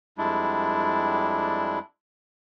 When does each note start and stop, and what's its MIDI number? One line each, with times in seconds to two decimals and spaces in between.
0.18 1.79 41
0.18 1.79 55
0.18 1.79 56
0.18 1.79 62
0.18 1.79 64